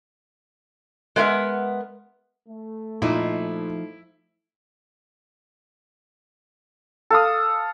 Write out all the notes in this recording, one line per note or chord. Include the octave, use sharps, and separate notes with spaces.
G#3 A3 B3 A#4 E5 F#5
A3
A#2 F3 D#4 E4
A4 F5 D#6